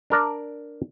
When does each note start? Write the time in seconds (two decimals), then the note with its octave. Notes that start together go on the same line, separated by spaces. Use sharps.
0.10 D4 A#4 D5